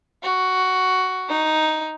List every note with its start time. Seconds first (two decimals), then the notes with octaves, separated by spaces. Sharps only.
0.23 F#4
1.28 D#4